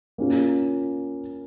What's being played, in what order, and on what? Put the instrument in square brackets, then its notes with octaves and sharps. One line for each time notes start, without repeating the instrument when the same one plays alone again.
[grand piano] A#3 C#4 F4